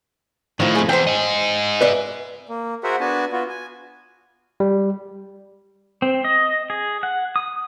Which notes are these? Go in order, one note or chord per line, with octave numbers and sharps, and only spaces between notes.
A2 D#3 F3
F2 F3 G#4
E2 C5 G5
D#4 G#4
B4 D5 E5
A#3
F#4 G#4 A#4 C5 E5 F#5
B3 D4 F#4 G#5 A5
B3 F4 F#4
G#5
G3
C4
D#5
G#4
F#5
D#6